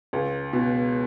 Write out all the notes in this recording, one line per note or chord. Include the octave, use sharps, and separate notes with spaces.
C#2
B2